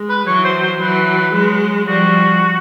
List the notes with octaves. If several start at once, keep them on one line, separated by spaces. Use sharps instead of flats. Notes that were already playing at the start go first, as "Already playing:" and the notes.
Already playing: G#3
B4
E3 F#3 C#5
C5
C5
E3 F#3 B4
F#3 G#3
F3 G3 F#4